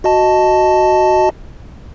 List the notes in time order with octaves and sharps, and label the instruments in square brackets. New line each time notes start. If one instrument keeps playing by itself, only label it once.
[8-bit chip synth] F#4 D#5 A5